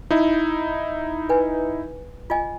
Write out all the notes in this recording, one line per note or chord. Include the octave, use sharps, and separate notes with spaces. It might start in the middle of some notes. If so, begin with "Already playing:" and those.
D#4 E4
B4 G#5
F4 D#5 G#5